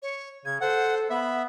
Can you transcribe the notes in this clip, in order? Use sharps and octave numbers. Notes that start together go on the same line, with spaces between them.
C#5
C#3 G#6
A4 C5 F#5
B3 E5 B5